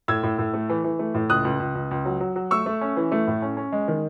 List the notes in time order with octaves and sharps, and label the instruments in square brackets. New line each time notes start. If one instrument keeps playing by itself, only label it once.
[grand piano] A2 E6 G#6
A2
A2
A3
E3
E3
A3
A2
C#2 D#6 F#6
C#2
C#2
C#2
C#2
F#3
F#3
F#3
A3 C#6 E6
A3
C#4
E3
A3
A2
C#4
C#4
G#3
D#3